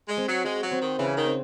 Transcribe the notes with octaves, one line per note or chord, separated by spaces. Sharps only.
G#3
C4
F#3
G#3 F#4
F#3
C4
D#3
C#3 E3
D#3
C4